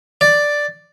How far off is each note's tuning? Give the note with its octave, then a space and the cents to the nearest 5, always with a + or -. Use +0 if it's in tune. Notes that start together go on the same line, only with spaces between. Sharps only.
D5 +0